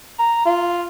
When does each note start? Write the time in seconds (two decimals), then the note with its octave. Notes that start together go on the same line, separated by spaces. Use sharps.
0.19 A#5
0.46 F4